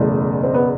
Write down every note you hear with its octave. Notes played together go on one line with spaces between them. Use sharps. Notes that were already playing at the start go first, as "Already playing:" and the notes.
Already playing: F#1 E2 B2 A3
C4
B3